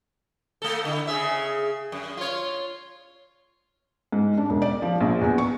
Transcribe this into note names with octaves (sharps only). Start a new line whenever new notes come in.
A3 A4
D3 E4
C#3 G#4 E5
F#2
F4 C#5
G#2
D4
E1
D5
F3
A#1
E2
C#6